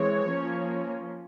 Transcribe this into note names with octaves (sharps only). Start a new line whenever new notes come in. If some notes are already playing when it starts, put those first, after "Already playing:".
Already playing: E3 G#3 C4 C#5
F3 A#3 C#4